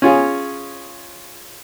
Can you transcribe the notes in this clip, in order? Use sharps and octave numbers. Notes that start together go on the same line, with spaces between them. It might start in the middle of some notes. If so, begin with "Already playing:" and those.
C#4 F4 G#4